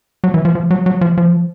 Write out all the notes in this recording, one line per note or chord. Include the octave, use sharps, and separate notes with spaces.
F#3
E3
F3
F3
F#3
F#3
F3
F3